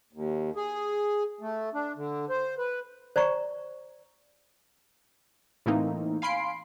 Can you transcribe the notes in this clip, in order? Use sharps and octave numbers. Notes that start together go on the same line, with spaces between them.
D#2
G#4
A3
D4
D3
C5
B4
C5 D5 A#5 C#6
A2 E3 A3 A#3 C4 D#4
F5 G#5 B5 C6 C7 D7